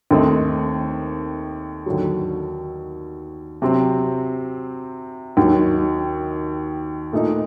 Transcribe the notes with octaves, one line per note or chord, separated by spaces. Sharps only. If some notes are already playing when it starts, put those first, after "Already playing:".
D#2 D#3 A3 C4 D#4
D#2 D3 F#3
C3 F#3 C4
D#2 D#3 F#3
A#2 A3 D#4